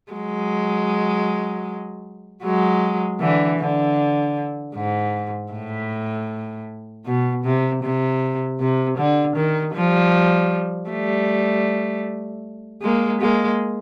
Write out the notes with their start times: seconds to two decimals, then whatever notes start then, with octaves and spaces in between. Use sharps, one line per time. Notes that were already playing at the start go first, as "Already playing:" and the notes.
0.12 F#3 G#3
2.43 F#3 G#3
3.20 D3 E3
3.59 D3
4.75 G#2
5.52 A2
7.06 B2
7.45 C3
7.83 C3
8.60 C3
8.98 D3
9.36 D#3
9.75 F3 G3
10.90 G3 A3
12.82 G#3 A#3
13.21 G#3 A#3